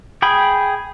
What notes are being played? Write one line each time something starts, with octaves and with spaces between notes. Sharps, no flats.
G#4 G5 B5